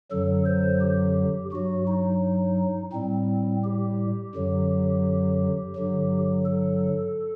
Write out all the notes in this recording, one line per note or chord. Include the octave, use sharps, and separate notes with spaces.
F#2 D3 F#3 A4
C5
G4
G2 F#3 F#4
D#4
A2 G3 C4
G4
F#2 D3 F#3
G2 D3 F#3
A4